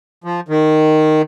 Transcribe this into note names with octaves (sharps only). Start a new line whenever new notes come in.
F3
D#3